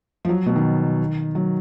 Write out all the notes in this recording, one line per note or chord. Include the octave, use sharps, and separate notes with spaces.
F3
F#3
B2
D#3
F#3